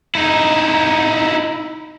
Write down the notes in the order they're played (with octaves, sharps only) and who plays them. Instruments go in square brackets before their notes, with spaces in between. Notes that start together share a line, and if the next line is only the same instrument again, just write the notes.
[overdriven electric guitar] D#4 E4